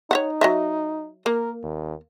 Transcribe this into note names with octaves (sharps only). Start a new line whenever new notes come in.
D#4 C#5 E5 F#5
F#3 D#5 E5
A#3 A#4
D#2